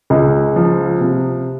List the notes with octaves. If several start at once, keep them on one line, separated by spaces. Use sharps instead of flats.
C#2
F3
C3